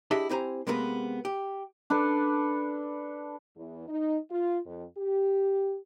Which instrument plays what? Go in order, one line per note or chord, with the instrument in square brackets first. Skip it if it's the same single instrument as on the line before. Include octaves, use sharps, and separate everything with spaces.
[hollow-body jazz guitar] D4 E4 G4 G#4 D#5 E5
C4 E4 G4 C5 G#5 A#5
C3 G#3 A#3 B3 A#4 B4
G4
[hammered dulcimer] D4 A4 B4
[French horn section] E2
D#4
F4
F2
G4